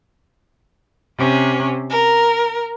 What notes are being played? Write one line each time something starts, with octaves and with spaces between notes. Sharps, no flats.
C3 C#4
A#4